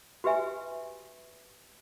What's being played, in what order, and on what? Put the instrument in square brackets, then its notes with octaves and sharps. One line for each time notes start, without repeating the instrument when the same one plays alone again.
[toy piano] F#4 G4 B4 E5 G#5